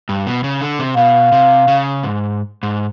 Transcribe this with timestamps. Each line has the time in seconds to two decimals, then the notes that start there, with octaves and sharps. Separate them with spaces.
0.09 G2
0.27 B2
0.44 C#3
0.61 D3
0.79 C3
0.97 B2 F5
1.32 C3
1.68 C#3
2.03 G#2
2.63 G#2